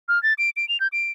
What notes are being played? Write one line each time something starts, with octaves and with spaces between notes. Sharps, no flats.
F6
A6
D7
D7
F7
G6
D7